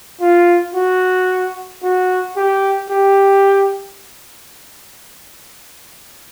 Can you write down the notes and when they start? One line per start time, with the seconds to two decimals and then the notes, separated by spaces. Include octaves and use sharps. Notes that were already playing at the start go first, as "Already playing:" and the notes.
0.21 F4
0.75 F#4
1.83 F#4
2.36 G4
2.90 G4